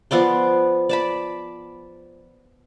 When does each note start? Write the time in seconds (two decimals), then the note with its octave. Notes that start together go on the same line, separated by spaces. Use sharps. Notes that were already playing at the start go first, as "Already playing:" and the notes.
0.11 F3 B3 D5 C6
0.89 D5 A5 B5